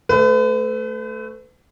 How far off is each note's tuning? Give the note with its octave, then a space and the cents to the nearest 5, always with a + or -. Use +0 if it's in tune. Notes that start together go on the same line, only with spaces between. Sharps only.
A3 +0 B4 +40